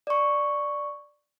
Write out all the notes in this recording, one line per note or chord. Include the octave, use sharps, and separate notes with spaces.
D5 C#6